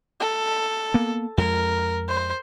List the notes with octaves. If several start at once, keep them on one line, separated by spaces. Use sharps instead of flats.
A4
A#3 B3
F2 G#3 A#4
C5